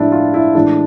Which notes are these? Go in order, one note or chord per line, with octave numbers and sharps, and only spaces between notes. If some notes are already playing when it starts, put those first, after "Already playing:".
Already playing: A2 F3 G#3 D4 E4
F4
E4
A2 E3 G#3 D4